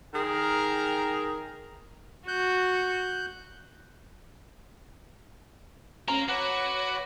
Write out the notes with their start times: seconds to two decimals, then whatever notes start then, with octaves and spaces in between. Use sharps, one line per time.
0.14 D#3 G#4 A#4
2.28 F#4 F#6 G6
6.08 C#4 A#4 F5 A#5
6.29 F#4 B4 C#5 F#5 D6